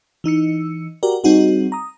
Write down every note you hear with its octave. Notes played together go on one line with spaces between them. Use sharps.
E3 D#4 E6 C#7
F#4 G4 A#4 D5
G3 C4 D#4 F#4 G#4
A#5 D#6